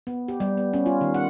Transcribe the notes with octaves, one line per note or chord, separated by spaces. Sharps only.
B3
G4
G3
B3
C#4
F4
D#3
F#5